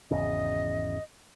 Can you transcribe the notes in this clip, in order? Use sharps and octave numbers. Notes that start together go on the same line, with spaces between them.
G#1 E2 C#3 D#5